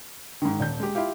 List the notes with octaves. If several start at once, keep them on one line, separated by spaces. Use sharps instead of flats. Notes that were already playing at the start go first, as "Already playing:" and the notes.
G#2 D#3
D#1 G6
G#3 G4
E4 F4 G4 F5